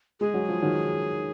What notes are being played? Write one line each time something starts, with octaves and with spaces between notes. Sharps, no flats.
G#3 G#4
F#3
F3
D#3 F#3